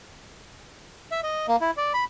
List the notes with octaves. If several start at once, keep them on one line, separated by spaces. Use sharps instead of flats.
E5
D#5
A#3
E4
D5
B5